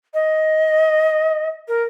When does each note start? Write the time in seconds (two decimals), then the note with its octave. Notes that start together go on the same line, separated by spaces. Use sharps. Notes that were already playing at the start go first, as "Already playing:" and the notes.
0.14 D#5
1.68 A#4